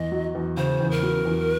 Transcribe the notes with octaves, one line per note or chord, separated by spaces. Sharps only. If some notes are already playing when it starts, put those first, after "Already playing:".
Already playing: E2 D#5
F#3
E2
C#3 C5
E2
A#4
F#3
E2